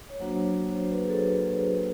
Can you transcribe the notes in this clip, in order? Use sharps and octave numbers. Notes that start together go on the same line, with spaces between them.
C#5
F#3 A#3 D4 F#4 C5
C5
B4
G#4
A4
G#4